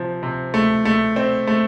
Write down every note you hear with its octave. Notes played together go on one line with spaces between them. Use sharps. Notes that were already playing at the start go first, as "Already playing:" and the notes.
Already playing: C3 F3
C3
A3
A3
C4
A3